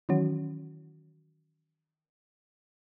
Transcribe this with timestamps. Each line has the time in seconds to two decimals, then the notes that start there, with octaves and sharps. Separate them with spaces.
0.09 D#3 E3 F#3 C#4 F#4